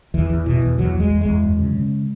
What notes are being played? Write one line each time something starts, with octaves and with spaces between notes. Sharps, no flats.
E2 E3
E2
B2 E3
E2
E2 F#3
E2
G#3
E2
G#3
E2
F#2
C#3
C#3